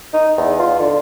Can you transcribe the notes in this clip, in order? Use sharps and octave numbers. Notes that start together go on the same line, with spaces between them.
D#4
E2
F4
D3